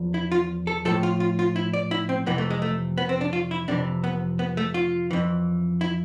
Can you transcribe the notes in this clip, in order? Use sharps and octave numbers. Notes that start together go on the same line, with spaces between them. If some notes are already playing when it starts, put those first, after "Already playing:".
Already playing: E2 F3
E4
F4
A4
A2 F3 A4
F4
F4
F4
E4
D5
E4
C4
F2 C3 E3 B3
A3
G#3
A3
B3
C4
D4
F4
E4
F2 C3 E3 D4
B3
B3
A3
F4
F2 E3
E4